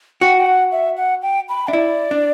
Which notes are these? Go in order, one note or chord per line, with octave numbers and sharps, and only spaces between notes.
F#4 G5
G5
F#5
E5
F#5
G5
B5
D4 E5
E4 D5
D4